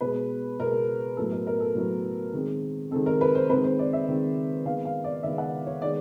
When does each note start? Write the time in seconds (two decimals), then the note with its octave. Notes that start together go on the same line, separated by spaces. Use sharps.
0.01 B2 G#3 B3 B4
0.59 B2 G#3 B3 A#4
1.17 A2 F#3 B3 A4
1.32 A#4
1.47 A#4
1.60 A4
1.75 A2 F#3 B3
2.33 D#3 G#3 C4
2.91 D#3 G#3 C4 A4
3.06 A#4
3.21 B4
3.35 C5
3.49 D#3 G#3 C4 B4
3.64 C5
3.79 D5
3.93 E5
4.08 D#3 G#3 C4
4.66 D#3 G#3 B3 F5
4.85 F5
5.04 D5
5.23 D#3 G#3 B3 E5
5.38 F#5
5.67 C#5
5.82 D#3 G#3 B3 D5